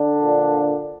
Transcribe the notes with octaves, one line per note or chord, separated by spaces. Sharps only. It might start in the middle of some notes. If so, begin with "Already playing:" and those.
Already playing: D3 D4
A#2 F3